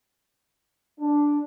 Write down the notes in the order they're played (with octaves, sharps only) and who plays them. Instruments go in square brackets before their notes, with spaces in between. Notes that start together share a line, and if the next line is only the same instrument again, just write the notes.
[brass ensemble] D4